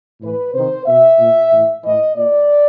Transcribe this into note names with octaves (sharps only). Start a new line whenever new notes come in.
A2 E3 B4
C3 D#3 C5
B2 E5
A#2
A2 E3
A2 E3 D#5
A#2 D5